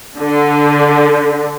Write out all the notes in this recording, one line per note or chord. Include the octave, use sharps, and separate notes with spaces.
D3